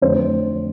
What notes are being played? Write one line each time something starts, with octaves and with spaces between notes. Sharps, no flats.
F2 D3 A3 C4 C5